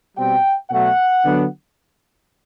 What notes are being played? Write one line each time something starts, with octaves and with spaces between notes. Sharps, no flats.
B2 G3 C4 G5
B2 F#3 A3 F#5
D3 F#3 B3 D4